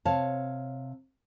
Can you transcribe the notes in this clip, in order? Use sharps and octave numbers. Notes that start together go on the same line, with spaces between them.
C3 C#5 F5 A5